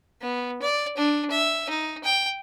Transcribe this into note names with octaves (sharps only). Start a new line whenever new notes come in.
B3
D5
D4
E5
D#4
G5